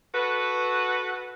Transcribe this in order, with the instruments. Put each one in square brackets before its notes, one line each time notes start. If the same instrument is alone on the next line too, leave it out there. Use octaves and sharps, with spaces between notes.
[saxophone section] F#4 A4 B4